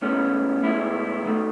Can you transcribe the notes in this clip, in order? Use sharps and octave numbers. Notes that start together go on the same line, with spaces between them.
A2 G#3 B3 C#4
A2 G#3 B3 E4
D#3 A3